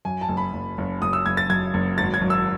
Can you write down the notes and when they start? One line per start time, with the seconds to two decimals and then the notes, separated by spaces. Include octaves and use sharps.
0.05 F#2 G#5
0.21 A5
0.29 F#1
0.37 B5
0.53 F#1
0.78 F#1
1.02 F#1 D#6
1.13 E6
1.26 F#1 G#6
1.37 A6
1.50 F#2 G#6
1.74 F#1
1.98 G#1 A6
2.14 G#6
2.22 F#2
2.30 E6